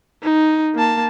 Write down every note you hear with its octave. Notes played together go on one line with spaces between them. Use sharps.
D#4
A#3 A5